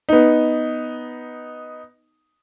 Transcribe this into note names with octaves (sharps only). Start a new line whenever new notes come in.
B3 D#4